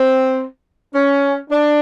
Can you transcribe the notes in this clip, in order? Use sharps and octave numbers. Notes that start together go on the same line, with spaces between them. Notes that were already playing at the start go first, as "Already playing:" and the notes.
Already playing: C4
C#4
D4